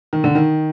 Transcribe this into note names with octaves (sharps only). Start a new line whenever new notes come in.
D#3
D3
D#3